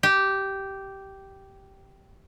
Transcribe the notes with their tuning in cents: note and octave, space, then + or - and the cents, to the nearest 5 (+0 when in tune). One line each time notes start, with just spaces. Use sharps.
G4 -10